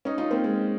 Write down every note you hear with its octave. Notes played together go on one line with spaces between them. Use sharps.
C#4 D#4
D#4 F4
A#3 C4
G#3